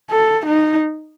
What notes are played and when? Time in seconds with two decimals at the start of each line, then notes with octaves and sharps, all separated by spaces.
0.11 A4
0.46 D#4